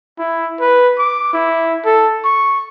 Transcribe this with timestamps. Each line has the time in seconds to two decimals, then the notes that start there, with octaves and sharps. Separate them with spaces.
0.18 E4
0.60 B4
0.99 D6
1.33 E4
1.85 A4
2.25 C#6